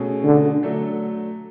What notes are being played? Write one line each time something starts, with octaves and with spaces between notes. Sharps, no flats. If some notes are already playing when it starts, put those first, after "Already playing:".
Already playing: B2 A3 C#4 G#4
D3
F#3 A3 D4 A4